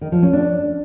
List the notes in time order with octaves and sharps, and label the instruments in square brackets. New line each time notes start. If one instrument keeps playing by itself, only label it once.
[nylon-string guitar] D#3
F3
C#4
D4